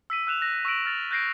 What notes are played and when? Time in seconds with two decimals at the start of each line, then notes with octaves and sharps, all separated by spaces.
0.10 E6 B6 D#7
0.27 E6 F#6 E7 F7
0.41 F#6 A#6
0.65 C#6 E6 F#6 A#6 D7 F#7
0.86 F6 A6 F7
1.11 F#6 G6 A#6 C7 D7